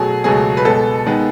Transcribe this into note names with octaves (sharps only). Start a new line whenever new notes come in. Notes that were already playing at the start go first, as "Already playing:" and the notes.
Already playing: B2 F#3 A3 G#4
C#2 B2 F#3 A3 G#4
B4
B2 G#3 B3 A4
D#3 G#3 B3